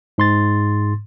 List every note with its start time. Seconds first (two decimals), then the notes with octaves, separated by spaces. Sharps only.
0.18 G#2 C6 A6